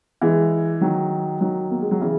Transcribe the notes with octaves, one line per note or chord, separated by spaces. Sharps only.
E3 G#3
D#3 F#3
D#3 F#3
A#3
G#3
F#3
C#3 E3